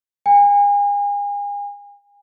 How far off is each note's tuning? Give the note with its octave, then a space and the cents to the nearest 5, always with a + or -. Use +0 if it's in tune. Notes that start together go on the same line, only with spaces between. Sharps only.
G#5 -35